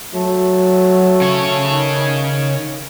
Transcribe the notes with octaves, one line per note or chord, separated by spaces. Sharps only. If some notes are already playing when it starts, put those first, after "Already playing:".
F#3 A3
C#3 C#5
D#3